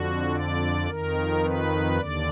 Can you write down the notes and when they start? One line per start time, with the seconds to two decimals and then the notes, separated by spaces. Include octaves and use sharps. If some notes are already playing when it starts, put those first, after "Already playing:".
Already playing: F2 D3 F#4
0.32 D5
0.88 F2 D#3 A#4
1.43 B4
1.98 D#2 D3 D5